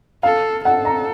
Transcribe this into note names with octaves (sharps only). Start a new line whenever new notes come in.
A4 F5
A4 F#5
A#5